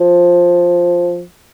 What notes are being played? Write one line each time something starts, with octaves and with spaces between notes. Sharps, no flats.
F3